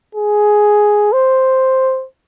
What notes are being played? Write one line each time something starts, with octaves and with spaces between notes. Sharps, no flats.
G#4
C5